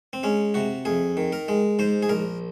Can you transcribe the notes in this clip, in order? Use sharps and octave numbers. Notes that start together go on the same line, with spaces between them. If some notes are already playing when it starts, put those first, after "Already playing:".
C4
G#3 C#4
C3 F#4
F2 G#4
D#3
A#4
G#3
G#2 C5
G#4
A#1 A#4